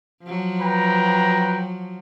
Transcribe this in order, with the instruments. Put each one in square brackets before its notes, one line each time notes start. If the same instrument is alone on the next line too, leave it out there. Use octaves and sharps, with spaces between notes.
[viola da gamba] F3 F#3
[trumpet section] B4 G5 A#5